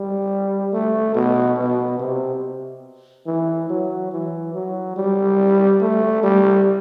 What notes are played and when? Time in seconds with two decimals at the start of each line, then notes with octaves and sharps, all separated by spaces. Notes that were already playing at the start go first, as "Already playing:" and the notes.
Already playing: G3
0.73 A3
1.15 B2
1.58 B2
1.99 C3
3.27 E3
3.70 F#3
4.12 E3
4.55 F#3
4.97 G3
5.81 A3
6.23 G3